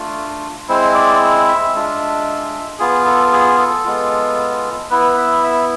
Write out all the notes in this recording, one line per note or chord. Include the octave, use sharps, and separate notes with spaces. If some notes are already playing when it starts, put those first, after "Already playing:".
Already playing: A3 D4 F4
G#3 C4 E4 C5
D5
E5
G#3 D4 F4
B3 F4 G#4
A4
A4
G#4
A4
G#3 B3 F4
B3 E4 B4
E5
E5